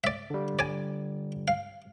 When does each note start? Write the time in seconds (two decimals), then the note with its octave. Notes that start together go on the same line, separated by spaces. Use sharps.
0.04 D5 E5
0.30 D3 G3
0.59 D5 G#5
1.48 F5